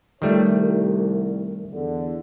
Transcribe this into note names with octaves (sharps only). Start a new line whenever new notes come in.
D#3 G3 A3 F4 C#5
C2
E2 D3